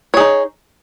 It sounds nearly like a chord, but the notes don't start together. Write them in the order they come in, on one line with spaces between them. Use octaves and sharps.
C#5 G#4 D#4